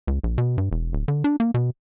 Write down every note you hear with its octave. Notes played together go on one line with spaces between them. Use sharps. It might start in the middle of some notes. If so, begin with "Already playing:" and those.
C#2
A#1
B2
G2
E1
D1
D3
D4
A#3
B2